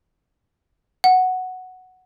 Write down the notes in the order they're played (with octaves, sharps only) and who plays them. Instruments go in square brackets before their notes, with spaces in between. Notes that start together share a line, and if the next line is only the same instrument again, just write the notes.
[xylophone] F#5